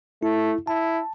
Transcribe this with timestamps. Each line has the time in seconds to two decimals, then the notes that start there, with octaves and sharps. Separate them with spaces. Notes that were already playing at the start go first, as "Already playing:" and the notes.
0.23 A3 E4
0.67 E4 A5